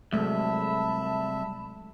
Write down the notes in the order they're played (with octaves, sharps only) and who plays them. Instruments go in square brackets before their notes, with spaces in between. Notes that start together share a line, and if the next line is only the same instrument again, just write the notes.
[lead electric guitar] C2 [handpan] F#3 G#3 A3 [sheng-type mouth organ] E5 [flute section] A5 B5